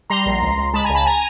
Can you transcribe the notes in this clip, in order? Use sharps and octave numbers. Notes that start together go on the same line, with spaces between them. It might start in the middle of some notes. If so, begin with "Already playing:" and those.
G3 A#5 C6
A#1
C#2
C#2
G#3 A5 B5
G#5 A#5
C#2
A5 B5
G#5 A#5